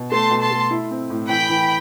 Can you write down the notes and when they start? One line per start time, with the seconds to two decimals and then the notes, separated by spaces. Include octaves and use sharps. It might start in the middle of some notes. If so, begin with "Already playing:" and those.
Already playing: B2
0.12 A3 A5 C6
0.31 B2
0.41 A5 C6
0.51 A3
0.71 E4
0.91 C4
1.10 A2
1.29 E3 G5 B5
1.49 E3